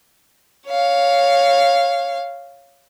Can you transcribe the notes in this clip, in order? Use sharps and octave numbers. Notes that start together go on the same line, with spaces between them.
C#5 F5